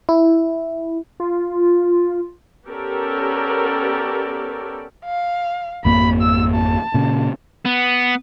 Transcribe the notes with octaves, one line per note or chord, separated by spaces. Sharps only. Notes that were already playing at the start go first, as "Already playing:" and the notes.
E4
F4
B3 C#4 G4 A4 A#4 D5
F5
G#1 F2 A#3 B5
E6
A5
A#2 C#3
B3